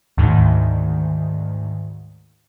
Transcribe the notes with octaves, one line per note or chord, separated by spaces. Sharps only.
D2 G#2 D#3